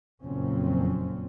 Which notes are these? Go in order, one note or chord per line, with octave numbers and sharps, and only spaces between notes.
F#1 F2 A#2 C4 C#4